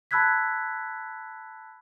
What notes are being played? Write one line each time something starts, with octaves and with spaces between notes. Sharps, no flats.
A5 B5 E6 F#6 G#6 B6